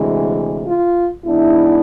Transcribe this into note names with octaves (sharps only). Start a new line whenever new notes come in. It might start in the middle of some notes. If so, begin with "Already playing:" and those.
Already playing: D2 C3 E3 G#3
F4
G#2 E3 B3 D4 E4